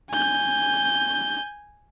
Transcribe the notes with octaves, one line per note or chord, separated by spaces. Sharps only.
G#5 G6